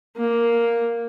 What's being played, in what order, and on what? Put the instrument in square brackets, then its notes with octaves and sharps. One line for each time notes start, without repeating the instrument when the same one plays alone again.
[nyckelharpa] A#3